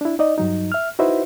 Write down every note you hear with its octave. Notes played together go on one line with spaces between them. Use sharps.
D4 E4
D#4 D5 D#5
G2 F#3 D#4
E5 F6
D#4 E4 F#4 B4 C5 E5